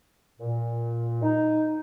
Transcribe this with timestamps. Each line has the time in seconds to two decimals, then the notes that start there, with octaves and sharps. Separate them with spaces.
0.40 A#2
1.23 D#4